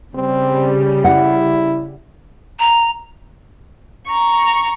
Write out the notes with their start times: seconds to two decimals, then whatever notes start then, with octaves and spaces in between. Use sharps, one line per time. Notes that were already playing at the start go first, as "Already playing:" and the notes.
0.15 C#3 G3 C4
1.04 E4 F#5
2.60 A#5
4.07 A#5 C#6